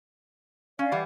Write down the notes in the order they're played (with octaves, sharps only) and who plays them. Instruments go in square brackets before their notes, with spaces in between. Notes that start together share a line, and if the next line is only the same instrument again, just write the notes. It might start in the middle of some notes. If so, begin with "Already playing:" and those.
[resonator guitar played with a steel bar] C#4 [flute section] D5 F5
[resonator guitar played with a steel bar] E3 G3 F#5